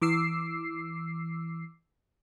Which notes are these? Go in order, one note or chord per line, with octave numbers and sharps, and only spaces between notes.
E3 D6 E6 C7